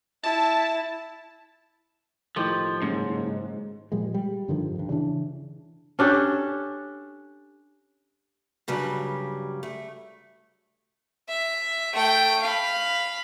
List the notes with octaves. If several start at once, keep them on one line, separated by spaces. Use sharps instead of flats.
E4 A5
A2 D#3 F3 G4
F#1 G#2 C#3
A#2 F3 G3 G#3
G3
G2 D3 D#3 F3
D#1 G2
C#3 E3 D4
C#4 D4 G4 A4
G2 C#3 F#3 G3
A3
E5
A3 G5
F5 B5